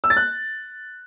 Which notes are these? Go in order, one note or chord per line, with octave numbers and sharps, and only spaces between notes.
E6
A6
F#6